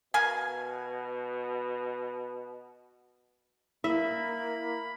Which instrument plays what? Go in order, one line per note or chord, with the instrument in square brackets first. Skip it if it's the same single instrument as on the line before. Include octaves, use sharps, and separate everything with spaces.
[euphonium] B2 [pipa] A#4 F5 G#5
[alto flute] A#3 [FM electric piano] E4 [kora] E5 [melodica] B5